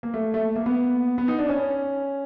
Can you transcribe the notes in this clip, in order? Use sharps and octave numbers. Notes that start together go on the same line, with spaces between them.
A#3
A3
A3
A#3
B3
B3
D#4
D4
C#4